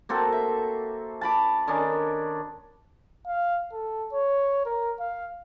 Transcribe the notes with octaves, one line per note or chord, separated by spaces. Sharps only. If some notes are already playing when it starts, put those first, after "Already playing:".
A#3 C4 F#4 A4
E5
A5 B5 D6
D#3 C#4 D4
F5
A4
C#5
A#4
F5